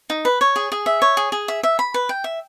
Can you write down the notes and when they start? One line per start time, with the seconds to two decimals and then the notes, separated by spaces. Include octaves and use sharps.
0.10 D#4
0.25 B4
0.41 C#5
0.56 G#4
0.72 G#4
0.86 E5
1.02 C#5
1.17 G#4
1.32 G#4
1.48 E5
1.63 E5
1.79 B5
1.94 B4
2.09 G5
2.24 E5